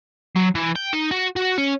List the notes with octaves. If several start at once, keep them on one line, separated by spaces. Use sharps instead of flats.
F#3
E3
G5
D#4
F#4
F#4
C#4